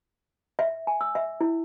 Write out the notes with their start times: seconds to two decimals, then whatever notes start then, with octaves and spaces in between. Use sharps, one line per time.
0.59 E5
0.87 G#5
1.01 E6
1.15 E5
1.41 E4